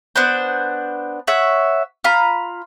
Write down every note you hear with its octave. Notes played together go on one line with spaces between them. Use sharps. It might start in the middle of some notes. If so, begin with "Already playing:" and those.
B3 D4 B4 C5
C#5 E5 F#5
F4 A#5 B5